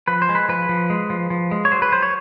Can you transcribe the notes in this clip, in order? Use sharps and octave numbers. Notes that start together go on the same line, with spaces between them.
F3 B4
C5
G#3
B4
F3 B4
F3
G#3
F3
F3
G#3
C#5
F#3 C5
B4
F#3 C5
C#5